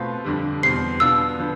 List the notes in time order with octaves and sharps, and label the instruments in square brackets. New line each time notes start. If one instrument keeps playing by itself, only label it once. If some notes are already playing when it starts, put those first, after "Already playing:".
Already playing: [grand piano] B2 A3 C4 F4 B4
F2 D3 G3
[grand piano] E2 B2 G3 C4 [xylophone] C7
[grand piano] B2 B3 D4 F4 [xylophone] E6
[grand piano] D3 F3 B3